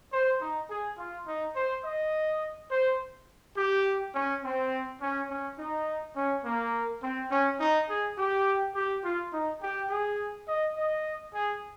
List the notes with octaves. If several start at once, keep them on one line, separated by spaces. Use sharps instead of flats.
C5
D#4
G#4
F4
D#4
C5
D#5
C5
G4
C#4
C4
C#4
C#4
D#4
C#4
A#3
C4
C#4
D#4
G#4
G4
G4
F4
D#4
G4
G#4
D#5
D#5
G#4